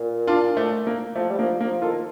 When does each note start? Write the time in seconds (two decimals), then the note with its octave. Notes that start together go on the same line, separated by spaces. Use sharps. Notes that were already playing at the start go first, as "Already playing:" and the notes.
Already playing: A#2
0.27 D4 F4
0.57 A3
0.87 A#3
1.16 F3 A3
1.30 G3
1.38 F3 A#3
1.60 F3 A#3
1.82 D#3 F4 A4